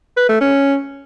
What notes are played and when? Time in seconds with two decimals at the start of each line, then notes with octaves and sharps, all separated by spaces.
0.17 B4
0.29 A3
0.41 C#4